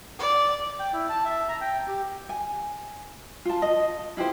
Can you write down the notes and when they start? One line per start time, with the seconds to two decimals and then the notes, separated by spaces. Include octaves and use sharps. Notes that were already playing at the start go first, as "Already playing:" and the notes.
0.19 D5
0.79 G5
0.93 E4
1.09 A5
1.25 E5
1.49 A#5
1.61 G5
1.88 G4
2.29 G#5
3.45 F4 A5
3.62 D#5
4.17 E4 F4 G4 C5